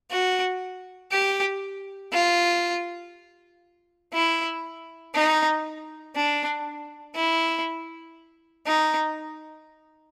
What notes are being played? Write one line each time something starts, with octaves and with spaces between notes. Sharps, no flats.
F#4
G4
F4
E4
D#4
D4
E4
D#4